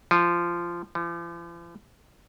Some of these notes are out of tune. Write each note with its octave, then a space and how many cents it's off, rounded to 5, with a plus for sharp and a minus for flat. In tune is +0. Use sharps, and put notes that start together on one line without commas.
F3 -15
F3 -45